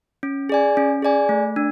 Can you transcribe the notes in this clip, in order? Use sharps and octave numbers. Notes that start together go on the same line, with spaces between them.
C#4
G#4 D5 G#5
C#4
G#4 D5 G#5
A3
D4